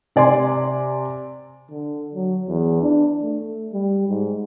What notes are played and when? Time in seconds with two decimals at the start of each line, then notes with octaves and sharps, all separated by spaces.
0.16 C3 D5 G#5 C6
1.71 D3
2.14 F#3
2.49 E2
2.82 D4
3.23 A3
3.73 G3
4.09 G#2